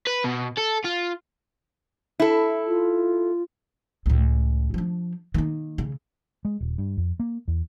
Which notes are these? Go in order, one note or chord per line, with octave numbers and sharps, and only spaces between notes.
B4
B2
A4
F4
E4 A4
F4
C#2 A2
F3 D4
D#3 A#3
C#3
G#3
D#1
G2
F2
A#3
E2